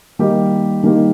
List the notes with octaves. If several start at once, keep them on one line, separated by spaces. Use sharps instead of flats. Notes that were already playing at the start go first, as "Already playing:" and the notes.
D#3 G3 A#3 D#4 G4
D#3 G3 A#3 D#4 G4